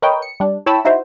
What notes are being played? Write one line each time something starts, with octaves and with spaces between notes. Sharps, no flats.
A#4 B4 C#5 D#5 G5
C#7
G3 D4
E4 C#5 G5 A5 B5 E6
D#4 E4 F#4 C5